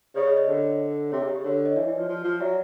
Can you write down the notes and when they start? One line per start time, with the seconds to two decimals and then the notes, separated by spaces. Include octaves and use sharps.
0.15 C#3 C5 D5
0.27 C#5 D#5
0.37 C#5 D#5
0.48 D3 C5 D5
1.12 C3 C#5
1.23 C#3
1.28 G4
1.34 C#3
1.44 D3 C#5
1.65 C#5 D#5
1.76 E3 D5 E5
1.86 E3
1.98 F3
2.08 F3
2.24 F3
2.40 F#3 D5 E5